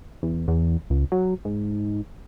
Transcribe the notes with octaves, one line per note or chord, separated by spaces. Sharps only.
E2
E2
C#2
F#3
G#2